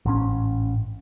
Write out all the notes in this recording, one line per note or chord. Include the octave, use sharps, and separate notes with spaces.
A1 G#2 C#4